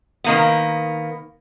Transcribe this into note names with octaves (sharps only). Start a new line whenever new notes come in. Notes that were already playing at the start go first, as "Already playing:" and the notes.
D#3 A#3 B3